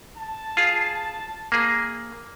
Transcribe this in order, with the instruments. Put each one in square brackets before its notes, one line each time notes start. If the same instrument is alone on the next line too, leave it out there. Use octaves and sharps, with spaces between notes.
[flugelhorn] A5
[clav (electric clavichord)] F4 G#4
A#3 G#4